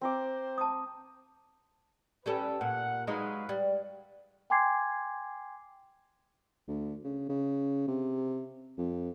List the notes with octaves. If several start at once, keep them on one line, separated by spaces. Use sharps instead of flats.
C4 C5 A#5 D6
A5 D#6
G3 C#4 A4 B4
A#2 F#5
F#3 G#3 D#4 B4 F5 F#5
G3
G5 G#5 C6 D6 G#6 C7
D2
C#3
C#3
C3
F2